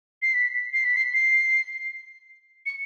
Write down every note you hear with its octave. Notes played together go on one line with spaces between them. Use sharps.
C7
B6
C7
B6
C7
C7
C#7